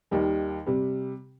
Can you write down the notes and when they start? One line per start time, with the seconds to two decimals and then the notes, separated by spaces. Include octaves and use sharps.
0.11 D#2 D#3 G3
0.66 C3 G3